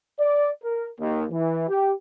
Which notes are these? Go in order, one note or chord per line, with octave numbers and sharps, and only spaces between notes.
D5
A#4
D#2
E3
G4